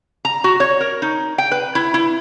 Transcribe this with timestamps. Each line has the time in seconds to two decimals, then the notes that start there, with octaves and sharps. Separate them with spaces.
0.25 A#5
0.44 F#4
0.60 C#5
0.81 A#4
1.02 D#4
1.38 G5
1.52 B4
1.75 E4
1.94 E4